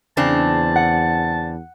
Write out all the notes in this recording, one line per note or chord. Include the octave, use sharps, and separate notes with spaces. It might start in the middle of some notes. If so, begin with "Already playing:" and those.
E2 C#3 C4 D4 A5
F#5